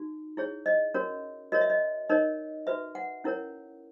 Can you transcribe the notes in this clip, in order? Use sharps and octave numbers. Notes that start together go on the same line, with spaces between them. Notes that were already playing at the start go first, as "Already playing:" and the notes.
Already playing: D#4 F#4
E4 G#4 C#5
D#5
C#4 F#4 A#4 C#5
F#4 A#4 C#5 D#5
E5
D#5
D#4 A#4 C#5 D#5
F#4 B4 E5
F#5
C#4 E4 A#4 C#5